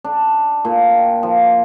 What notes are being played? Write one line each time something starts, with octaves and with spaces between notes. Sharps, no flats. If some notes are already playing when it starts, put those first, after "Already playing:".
D4
A#2
G5
F3